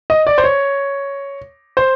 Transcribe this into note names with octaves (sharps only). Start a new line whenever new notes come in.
D#5
D5
C5
C#5
C5